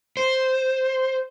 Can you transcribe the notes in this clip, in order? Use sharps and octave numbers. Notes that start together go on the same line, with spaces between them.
C5